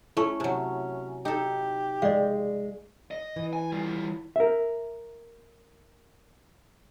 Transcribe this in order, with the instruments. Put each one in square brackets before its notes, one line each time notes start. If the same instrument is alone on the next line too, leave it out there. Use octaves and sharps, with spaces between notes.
[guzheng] A3 C#4 [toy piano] E4 C#6
[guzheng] C3 F#3 [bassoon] C#4
[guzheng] D#4 A4 [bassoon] G4
[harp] G#3 [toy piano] D5 D#5 F5
[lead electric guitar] D#5
[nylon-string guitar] E3
[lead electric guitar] G#5
G3 F4
[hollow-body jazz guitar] A#4 E5